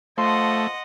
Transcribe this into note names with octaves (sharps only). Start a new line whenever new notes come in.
F3 A3 D#5 F#5 C6